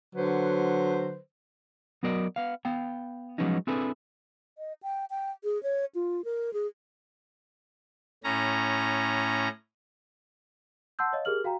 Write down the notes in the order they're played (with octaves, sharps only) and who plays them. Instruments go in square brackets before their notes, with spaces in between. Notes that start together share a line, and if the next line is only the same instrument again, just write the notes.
[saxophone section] D3 F#3 B4 C5
[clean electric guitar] F#3 B3 F#4 A#4 D5 D#5
B3 F5
B3 F5 G5
F3 F#3 G#3 B3 C#4 D#4
C4 D4 E4 G#4 A4 B4
[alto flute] D#5
G5
G5
G#4
C#5
F4
A#4
G#4
[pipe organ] A2 C#4 A#5
[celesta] F#5 A5 C6 E6 G6
C#5 D#5 F5
G4 G#4 A#4 F6 F#7
F#4 F5 G5 A#5